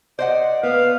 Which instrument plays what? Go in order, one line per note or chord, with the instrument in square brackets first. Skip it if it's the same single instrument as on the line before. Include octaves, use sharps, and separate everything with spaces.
[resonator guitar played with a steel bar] C5 D#5 F#5 [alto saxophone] D5
[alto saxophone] B3 [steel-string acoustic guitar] B4 [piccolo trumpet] F5